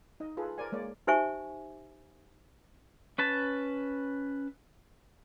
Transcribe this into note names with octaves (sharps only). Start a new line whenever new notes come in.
D#4 D#5
F4 G#4 A4 B4
A#4 C5 D5 G#5
G#3 A#3 C#5 D5
D#4 G4 C5 E5 G#5 C#6
C#4 B4 A5